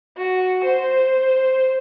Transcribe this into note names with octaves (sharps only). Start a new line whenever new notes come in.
F#4
C5